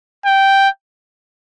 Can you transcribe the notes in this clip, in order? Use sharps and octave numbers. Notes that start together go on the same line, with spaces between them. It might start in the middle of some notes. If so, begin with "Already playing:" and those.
G5